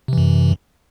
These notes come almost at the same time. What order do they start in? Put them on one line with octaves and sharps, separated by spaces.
C3 E3 F#2